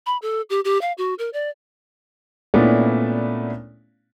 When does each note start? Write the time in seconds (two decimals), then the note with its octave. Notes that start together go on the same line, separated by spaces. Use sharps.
0.06 B5
0.22 A4
0.50 G4
0.65 G4
0.81 F5
0.98 F#4
1.19 A#4
1.33 D5
2.54 A#2 A3 B3 C#4 D4 E4